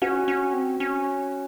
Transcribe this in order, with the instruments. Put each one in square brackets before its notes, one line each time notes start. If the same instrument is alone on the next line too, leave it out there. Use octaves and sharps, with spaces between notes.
[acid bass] C#4 [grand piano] F#4
[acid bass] C#4
C4
C#4